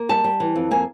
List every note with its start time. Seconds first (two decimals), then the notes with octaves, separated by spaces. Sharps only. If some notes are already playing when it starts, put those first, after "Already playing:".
Already playing: A#3
0.09 G3 A5
0.24 G3
0.40 E3
0.56 F2
0.71 A#3 G#5